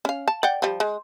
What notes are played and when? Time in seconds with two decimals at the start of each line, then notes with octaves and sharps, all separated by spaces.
0.05 C#4 F5
0.28 A5
0.43 D5 F#5 G5
0.62 F3 G3
0.80 G#3